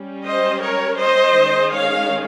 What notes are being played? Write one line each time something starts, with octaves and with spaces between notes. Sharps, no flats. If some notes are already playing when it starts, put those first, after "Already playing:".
Already playing: G3 C#4
C5 D#5
A#4 C#5
C5 D#5
D#3 G#3 C#4
C#5 F5